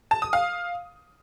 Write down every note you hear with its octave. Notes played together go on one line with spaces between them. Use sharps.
A5
D#6
F5